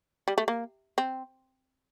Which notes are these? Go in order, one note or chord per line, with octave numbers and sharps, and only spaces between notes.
G3
A3
A#3
C4